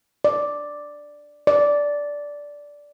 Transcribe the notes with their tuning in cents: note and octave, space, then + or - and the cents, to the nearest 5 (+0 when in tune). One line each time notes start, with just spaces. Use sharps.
D5 +0
D5 -10